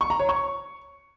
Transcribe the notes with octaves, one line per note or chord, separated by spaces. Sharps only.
C#6
A#5
C#5
C#6